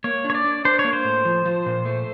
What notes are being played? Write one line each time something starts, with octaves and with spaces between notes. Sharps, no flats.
A#3 C#5
D4
C#5
D5
D4
D4 C5
C#5
A#3
C5
A2
F3
F3
A#2
A3